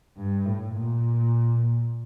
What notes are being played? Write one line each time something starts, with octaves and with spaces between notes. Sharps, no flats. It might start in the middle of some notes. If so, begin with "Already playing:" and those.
G2
A2
A#2